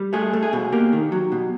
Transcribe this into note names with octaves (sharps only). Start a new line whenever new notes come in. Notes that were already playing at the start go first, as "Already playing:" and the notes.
Already playing: G3
A3 G#4
A3
G#4
B2
A#3 G4
D#3
F#3
B2